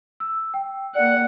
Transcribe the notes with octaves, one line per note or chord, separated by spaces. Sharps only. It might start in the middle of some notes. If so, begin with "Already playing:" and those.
E6
G5
A#3 D5 F#5